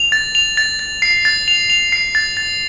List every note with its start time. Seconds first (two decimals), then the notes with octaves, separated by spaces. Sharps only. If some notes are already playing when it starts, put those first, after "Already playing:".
Already playing: F7
0.12 A6
0.35 F7
0.57 A6
0.79 A6
1.02 C7
1.25 A6
1.48 F7
1.70 F7
1.92 C7
2.15 A6
2.37 A6